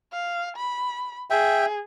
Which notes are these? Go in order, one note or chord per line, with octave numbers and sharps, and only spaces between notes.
F5
B5
G#4 E5 G5